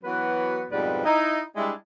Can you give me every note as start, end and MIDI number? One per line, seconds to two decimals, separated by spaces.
0.04 0.66 52
0.04 0.66 54
0.04 0.66 59
0.04 0.66 66
0.04 0.66 71
0.72 1.02 41
0.72 1.02 44
0.72 1.02 47
0.72 1.02 55
0.72 1.02 71
0.72 1.02 74
1.05 1.41 63
1.05 1.41 64
1.05 1.41 75
1.56 1.73 55
1.56 1.73 56
1.56 1.73 62
1.56 1.73 64